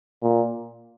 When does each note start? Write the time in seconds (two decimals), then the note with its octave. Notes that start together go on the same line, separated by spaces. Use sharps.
0.23 A#2